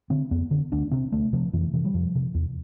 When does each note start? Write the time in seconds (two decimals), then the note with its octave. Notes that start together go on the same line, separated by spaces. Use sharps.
0.10 D3 C4
0.31 F2 B3
0.51 D3
0.72 D2 D4
0.91 C3 C4
1.12 D2 A3
1.33 C3 F3
1.53 F2 E3
1.74 C3 E3
1.85 G3
1.94 F2 F3
2.15 C3
2.34 E2